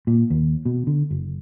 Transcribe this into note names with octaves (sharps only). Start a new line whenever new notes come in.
A#2
D#2
B2
D3
F#1